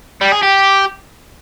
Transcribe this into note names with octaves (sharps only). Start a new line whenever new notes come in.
G3
G#4
G4